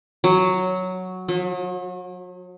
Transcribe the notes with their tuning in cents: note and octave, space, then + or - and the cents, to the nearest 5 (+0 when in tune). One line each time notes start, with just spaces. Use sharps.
F#3 +0
F#3 -40